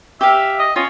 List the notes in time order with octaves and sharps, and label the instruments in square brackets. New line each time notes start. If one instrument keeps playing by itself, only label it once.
[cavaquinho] G4 F5 [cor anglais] E5
[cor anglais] D#5
[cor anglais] C#4 [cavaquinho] F4